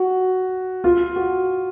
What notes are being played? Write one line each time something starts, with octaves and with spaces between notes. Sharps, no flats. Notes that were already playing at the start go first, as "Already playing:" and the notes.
Already playing: F#4
F4
F#4